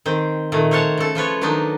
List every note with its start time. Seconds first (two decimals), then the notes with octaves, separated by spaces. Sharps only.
0.06 D#3 C4 C5
0.52 A#2 D#3 A3
0.71 C4 C#5 F5 F#5 A5
0.98 C#3 A4
1.15 F3 F4 B4 C#5
1.41 D#3 F#3 B3 D4 D#4